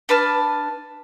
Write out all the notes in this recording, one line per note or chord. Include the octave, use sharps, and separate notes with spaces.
D4 B4 A5 F6